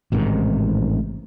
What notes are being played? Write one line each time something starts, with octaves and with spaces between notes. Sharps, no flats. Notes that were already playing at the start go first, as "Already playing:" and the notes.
A1 G#2 C3 D#3